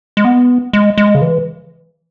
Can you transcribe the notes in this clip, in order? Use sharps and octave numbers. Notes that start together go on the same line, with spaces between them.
G#3
B3
G#3
G#3
C#3
E3